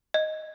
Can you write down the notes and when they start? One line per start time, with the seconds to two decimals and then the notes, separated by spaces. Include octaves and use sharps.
0.14 D#5